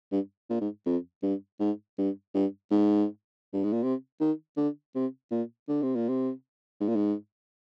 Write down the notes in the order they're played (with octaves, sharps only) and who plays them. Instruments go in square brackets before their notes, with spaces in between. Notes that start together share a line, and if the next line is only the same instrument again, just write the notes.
[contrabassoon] G2
A#2
G#2
F2
G2
G#2
G2
G2
G#2
G2
G#2
A#2
C3
D#3
D3
C3
A#2
D3
C3
A#2
C3
G#2
A#2
G#2